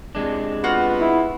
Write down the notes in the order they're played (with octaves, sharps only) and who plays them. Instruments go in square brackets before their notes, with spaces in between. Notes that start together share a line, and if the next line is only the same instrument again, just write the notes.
[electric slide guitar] C3 G#3 D4
[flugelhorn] B3 [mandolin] F4 F#4
[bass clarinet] E4